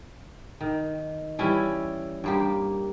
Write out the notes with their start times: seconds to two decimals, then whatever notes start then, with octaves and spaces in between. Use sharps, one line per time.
0.61 D#3
1.39 E3 G3 C#4 E4
2.24 G2 A#3 G4